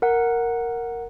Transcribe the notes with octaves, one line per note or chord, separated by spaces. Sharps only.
A#4 F#5